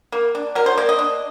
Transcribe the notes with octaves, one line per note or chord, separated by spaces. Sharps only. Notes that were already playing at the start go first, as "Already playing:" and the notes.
A#3
D4
F#3 A#4
C5
A#3 D5
D#5
D4